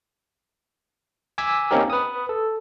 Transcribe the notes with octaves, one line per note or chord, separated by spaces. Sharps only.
G#5 D6 E6 G#6 B6
A#3 C4 C#4 D#4 G4 A#4
B4 D#6
A4